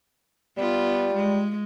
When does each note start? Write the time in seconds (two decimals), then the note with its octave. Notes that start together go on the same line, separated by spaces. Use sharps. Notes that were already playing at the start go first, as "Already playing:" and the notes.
0.57 G3 B3 F4
1.16 G#3